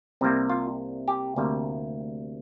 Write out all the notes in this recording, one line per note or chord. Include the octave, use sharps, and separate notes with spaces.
C2 C3 G3 A#3
F4
G4
D2 C3 G3 A#3